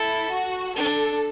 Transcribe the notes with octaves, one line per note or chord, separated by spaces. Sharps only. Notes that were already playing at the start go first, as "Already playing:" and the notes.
Already playing: E4 A4
F#4
D4 A4